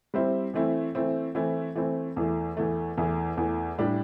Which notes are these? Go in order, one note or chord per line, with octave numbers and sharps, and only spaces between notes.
G3 C4 E4 C5
E3 A3 C4 E4
E3 A3 C4 E4
E3 A3 C4 E4
E3 A3 C4 E4
E2 E3 A3
E2 E3 A3
E2 E3 A3
E2 E3 A3
A2 G3 D4 G4